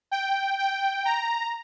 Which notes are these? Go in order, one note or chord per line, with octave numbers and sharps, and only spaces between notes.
G5
G5
A#5